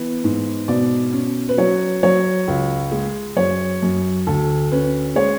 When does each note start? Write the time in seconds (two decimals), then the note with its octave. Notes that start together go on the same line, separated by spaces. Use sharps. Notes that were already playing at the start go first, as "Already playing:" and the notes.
Already playing: E3 B3
0.24 G#2
0.68 B2 D5
1.12 C#4
1.49 B4
1.57 F#3 C#5
2.03 F#3 C#5
2.47 C#2
2.92 G#3
3.36 F#2 C#5
3.82 F#2
4.27 D2 A4
4.72 C#4 B4
5.15 G#3 C#5